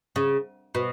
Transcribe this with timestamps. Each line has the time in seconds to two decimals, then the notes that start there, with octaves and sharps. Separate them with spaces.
0.16 C#3
0.75 B2